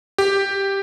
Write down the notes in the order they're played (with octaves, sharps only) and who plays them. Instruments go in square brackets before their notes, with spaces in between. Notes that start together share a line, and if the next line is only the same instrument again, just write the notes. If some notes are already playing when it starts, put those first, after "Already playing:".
[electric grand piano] G4